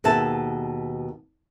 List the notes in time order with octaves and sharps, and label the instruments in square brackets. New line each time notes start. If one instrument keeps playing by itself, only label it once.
[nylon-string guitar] D#2 B2 G#4 B4 E5 A5